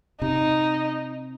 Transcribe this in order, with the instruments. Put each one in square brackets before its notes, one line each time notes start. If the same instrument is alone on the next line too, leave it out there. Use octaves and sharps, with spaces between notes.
[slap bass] C3 [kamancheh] D#4